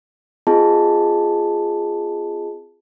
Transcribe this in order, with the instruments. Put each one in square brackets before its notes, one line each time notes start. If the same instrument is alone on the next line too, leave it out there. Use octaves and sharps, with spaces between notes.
[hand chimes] C4 F4 G#4 D#5 A5